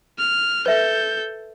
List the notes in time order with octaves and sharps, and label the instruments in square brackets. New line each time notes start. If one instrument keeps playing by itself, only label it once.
[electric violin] F6
[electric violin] A4 G6 [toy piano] B4 E5